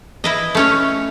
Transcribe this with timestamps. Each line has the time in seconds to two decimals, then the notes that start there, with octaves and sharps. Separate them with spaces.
0.24 E4 B4 D#5
0.55 A3 C#4 C#5